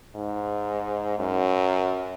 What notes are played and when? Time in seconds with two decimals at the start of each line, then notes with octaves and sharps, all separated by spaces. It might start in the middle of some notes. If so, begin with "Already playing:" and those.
0.16 G#2
1.19 F#2